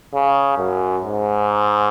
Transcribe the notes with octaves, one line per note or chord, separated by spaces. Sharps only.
C#3
F#2
G#2